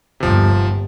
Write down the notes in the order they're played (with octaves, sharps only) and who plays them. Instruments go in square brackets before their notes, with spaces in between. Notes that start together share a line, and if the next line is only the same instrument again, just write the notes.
[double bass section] G1 D#2 [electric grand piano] C3 F3